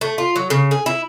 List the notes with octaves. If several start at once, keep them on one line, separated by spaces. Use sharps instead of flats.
A3
F4
F#3
C#3
G#4
E4